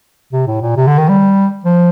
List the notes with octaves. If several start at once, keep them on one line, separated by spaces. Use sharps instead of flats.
C3
A2
A#2
C3
D3
D#3
G3
F3